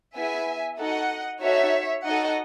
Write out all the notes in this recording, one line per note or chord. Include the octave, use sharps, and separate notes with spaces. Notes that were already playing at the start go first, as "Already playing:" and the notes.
B3 E4 G#4 E5 G#5
D#4 F#4 A4 D#5 F#5
D#4 F#4 A4 C#5 E5
D#4 F#4 A4 D#5 F#5